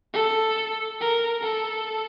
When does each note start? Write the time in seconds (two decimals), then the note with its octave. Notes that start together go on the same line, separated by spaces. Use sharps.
0.14 A4
1.01 A#4
1.43 A4